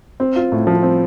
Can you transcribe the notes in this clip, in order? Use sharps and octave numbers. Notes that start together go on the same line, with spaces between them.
C4
F4
A2
F3
C4